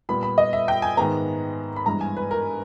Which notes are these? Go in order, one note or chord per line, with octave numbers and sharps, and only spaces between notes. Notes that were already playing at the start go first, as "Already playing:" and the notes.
A#2 G3 B3 B5
B5
D#5
E5
G5
G#5
G#2 D#3 G#3 B3 A#5
B5
G2 E3 G#3 B3 A#5
G#5
B4
A#4